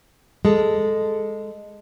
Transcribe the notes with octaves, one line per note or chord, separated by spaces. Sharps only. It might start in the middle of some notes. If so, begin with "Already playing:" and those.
G#3 A4